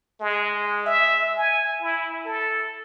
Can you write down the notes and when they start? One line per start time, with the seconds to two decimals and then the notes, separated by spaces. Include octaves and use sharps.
0.21 G#3
0.86 E5
1.37 G#5
1.81 E4
2.26 A4